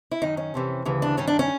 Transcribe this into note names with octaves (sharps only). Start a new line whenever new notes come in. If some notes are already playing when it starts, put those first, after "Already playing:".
E4
F#2 D#3 D#4
C#4
F2 C3 E3
D2 C#3 E3
D4
G2 D#3 C#4
D4
C#4